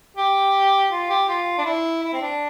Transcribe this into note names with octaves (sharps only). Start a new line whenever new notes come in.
G4
F4
G4
F4
D4
E4
E4
C4
D4